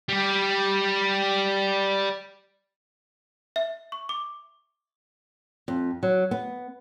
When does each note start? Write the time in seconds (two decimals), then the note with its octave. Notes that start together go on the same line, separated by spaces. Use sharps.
0.08 G3 G4
3.56 E5
3.92 C#6
4.09 D6
5.68 F2
6.03 F#3
6.31 B3